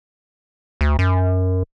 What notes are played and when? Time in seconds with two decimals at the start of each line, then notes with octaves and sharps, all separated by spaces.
0.81 D2
0.99 F#2